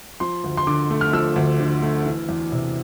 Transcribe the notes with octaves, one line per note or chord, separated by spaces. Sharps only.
F3 C6
D2
C6
D3 D6
A3
F6
F3 E6
D2
D3
A3
E3
E2
C3